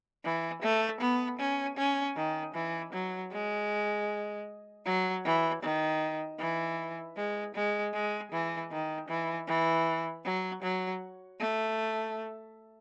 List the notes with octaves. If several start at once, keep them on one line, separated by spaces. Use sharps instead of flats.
E3
A3
B3
C#4
C#4
D#3
E3
F#3
G#3
F#3
E3
D#3
E3
G#3
G#3
G#3
E3
D#3
E3
E3
F#3
F#3
A3